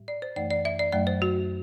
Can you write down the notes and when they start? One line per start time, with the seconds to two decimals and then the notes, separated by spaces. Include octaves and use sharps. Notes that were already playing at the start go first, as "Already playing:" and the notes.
Already playing: A2 G3
0.08 D5
0.22 C5
0.36 F#2 E3 A3 D5
0.50 D5
0.65 E5
0.79 D5
0.92 F#2 F#3 A3 D5
1.07 C5
1.22 F#4